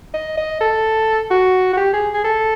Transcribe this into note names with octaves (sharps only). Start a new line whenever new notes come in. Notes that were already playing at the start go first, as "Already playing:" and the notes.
D#5
D#5
A4
F#4
F#4
G4
G#4
G#4
A4